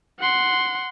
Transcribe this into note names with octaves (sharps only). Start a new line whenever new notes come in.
F#5 C6